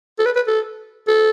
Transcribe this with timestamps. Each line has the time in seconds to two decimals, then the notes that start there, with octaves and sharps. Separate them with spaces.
0.19 A4
0.26 B4
0.36 B4
0.47 A4
1.08 A4